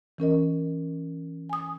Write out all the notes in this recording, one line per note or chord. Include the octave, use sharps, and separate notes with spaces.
E3 C#4 A#4 D#5
G#5 D#6